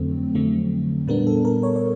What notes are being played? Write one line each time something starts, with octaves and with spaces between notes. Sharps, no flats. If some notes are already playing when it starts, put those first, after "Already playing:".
Already playing: F2 D3 F#3 A3 C4
F2 D3 F#3 A3 C4
A#2 G3 B3 D4 A#4
A4
A#4
C#5
C#5